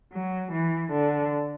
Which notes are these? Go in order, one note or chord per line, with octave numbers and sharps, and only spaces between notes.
F#3
E3
D3